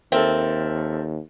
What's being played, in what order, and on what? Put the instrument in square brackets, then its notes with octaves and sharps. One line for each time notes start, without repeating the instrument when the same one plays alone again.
[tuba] D#2 [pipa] C4 [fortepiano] A4 A#4 E5